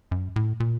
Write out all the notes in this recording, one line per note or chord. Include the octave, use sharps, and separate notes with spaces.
F#2
A2
A#2